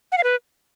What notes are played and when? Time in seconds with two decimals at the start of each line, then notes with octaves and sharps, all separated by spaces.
0.12 F#5
0.18 F5
0.24 B4